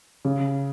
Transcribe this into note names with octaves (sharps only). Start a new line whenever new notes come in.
C#3